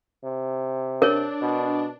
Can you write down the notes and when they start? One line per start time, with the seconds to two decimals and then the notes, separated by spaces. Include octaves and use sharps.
0.24 C3
1.02 D4 A#4 C#5
1.42 B2